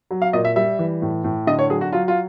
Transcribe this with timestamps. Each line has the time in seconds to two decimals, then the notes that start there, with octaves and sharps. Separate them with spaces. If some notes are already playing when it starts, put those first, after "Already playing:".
0.11 F#3
0.22 F5
0.33 A#2 D#5
0.45 E5
0.56 G3 E5
0.79 E3
1.02 A2
1.24 A2
1.47 D3 D#5
1.59 C#5
1.70 F#3 G#4
1.81 F#4
1.93 F#3 F4
2.08 F4